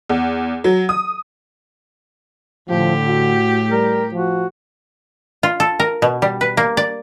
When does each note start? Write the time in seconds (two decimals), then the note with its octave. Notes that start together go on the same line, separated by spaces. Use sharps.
0.09 E2
0.64 F#3
0.89 D#6
2.69 A2 D3 F3 G4
3.07 F#4
3.70 G3 A#4
4.13 F3 F#4
5.43 F4
5.60 A4
5.80 A#4
6.02 B2
6.22 G3
6.41 B4
6.57 A#3
6.77 D5